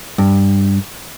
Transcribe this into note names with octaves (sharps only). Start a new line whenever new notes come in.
G2